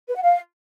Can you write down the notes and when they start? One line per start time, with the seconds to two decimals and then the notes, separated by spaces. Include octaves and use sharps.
0.09 B4
0.16 F#5
0.23 F5